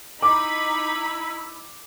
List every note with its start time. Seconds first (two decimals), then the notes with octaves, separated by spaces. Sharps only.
0.22 D#4 E4 B5 D6